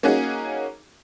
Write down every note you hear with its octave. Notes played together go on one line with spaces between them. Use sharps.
A#3 C#4 D#4 F#4 G#4